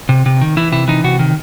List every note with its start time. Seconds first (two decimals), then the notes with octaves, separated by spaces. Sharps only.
0.09 C3
0.26 C3
0.41 D#3
0.57 E3 E4
0.72 C3 E4
0.88 E3 D#4
1.04 C3 F#4
1.19 D#3